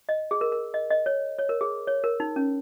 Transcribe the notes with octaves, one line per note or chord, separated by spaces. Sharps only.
D#5
G#4
A#4
A#4
D#5
D#5
C#5
C#5
A#4
G#4
C#5
A#4
D#4
C#4